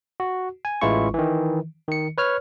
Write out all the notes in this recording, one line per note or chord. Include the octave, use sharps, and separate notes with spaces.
F#4
G#5
A1 E3 G#3 E4 F4 C#6
D#3 E3
D#3 C#7
B4 C#5 F6